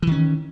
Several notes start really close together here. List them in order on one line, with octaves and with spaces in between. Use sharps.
E3 D#3 C#4